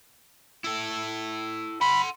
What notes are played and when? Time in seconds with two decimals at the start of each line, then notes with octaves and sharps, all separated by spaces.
0.64 E4 A4
1.81 F#5 B5 C6